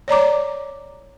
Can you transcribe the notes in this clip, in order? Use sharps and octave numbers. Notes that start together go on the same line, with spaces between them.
C#5 D5 A#5 D6